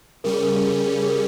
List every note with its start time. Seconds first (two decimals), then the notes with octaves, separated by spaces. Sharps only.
0.24 C#3 G3 C#4 A#4
0.34 G#4
0.43 A#4
0.67 G#4
1.03 G#4
1.09 A#4